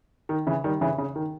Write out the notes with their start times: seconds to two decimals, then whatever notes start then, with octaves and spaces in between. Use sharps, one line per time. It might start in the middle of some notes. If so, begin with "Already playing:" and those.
0.29 D#3
0.47 C#3 E3
0.64 D#3 G3
0.81 C#3 E3
0.98 C#3
1.16 D#3